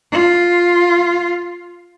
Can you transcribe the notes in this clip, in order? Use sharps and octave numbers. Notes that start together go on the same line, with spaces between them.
F4